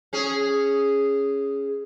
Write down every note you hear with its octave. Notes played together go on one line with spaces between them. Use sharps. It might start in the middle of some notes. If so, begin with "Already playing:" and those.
C#4 G#4